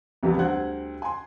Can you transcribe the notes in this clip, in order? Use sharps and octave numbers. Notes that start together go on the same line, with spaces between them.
C2 F2 C3 E3 G3 B3
D2 G3 C4 F#5 F#6 G#6
G#5 C6